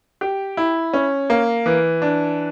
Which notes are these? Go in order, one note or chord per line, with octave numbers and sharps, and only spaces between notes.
G4
E4
C#4
A#3
E3
D4